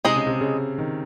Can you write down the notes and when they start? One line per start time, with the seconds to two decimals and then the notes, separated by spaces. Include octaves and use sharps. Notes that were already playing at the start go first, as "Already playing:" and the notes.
0.05 C3 G#3 D#4 G#4 D#5
0.16 C#3
0.27 C3
0.41 C#3
0.78 D#3